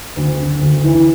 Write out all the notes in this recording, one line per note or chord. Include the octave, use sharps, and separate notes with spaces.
D2
D3
D2
E3